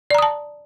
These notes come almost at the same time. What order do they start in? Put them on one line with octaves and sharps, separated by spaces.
D5 A#5 D#6 A5